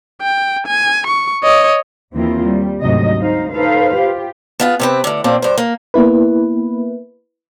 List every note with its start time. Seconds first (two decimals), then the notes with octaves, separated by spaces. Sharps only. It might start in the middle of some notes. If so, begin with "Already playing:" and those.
0.22 G5
0.67 G#5
1.07 C#6
1.43 C#5 D#5
2.14 D#2 D#3 E3 C4 E4 F4
2.44 G3
2.81 D2 G#2 C3 F#3 D#5
3.21 D#4 C5 F5
3.51 D#4 A4 B4 C5 F5
3.96 F4 G4
4.60 B3 F4 G#4
4.80 C3 C4 B4
5.04 A2 D3
5.24 A#2 A#3 C4 D4
5.42 G2 C5
5.58 A#3
5.94 A#3 B3 E4 B4